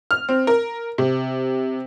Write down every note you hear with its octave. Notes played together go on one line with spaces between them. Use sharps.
F6
C4
A#4
C3